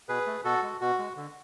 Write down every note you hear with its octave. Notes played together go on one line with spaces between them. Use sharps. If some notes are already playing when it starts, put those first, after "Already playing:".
B2 G#4 B4
A3
B2 F#4 A4
G#3
B2 F#4
G#3
D3